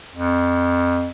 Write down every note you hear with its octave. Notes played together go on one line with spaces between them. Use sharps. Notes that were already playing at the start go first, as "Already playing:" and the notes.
F2